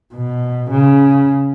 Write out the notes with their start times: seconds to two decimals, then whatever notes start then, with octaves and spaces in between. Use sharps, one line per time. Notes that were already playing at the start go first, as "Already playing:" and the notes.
0.14 B2
0.70 C#3